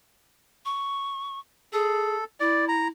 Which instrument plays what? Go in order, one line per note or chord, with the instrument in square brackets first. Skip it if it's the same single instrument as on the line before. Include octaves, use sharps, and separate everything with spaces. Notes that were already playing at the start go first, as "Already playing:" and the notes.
[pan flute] C#6
[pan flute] G#4 [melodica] A4
[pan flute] E4 [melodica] D5
[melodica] A#5